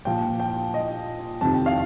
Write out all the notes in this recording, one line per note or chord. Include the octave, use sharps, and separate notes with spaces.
A#2 F3 G5
G5
D#5
F2 C3 D#3 A5
G5
F5